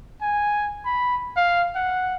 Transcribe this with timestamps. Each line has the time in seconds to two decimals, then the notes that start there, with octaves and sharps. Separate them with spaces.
0.21 G#5
0.85 B5
1.37 F5
1.75 F#5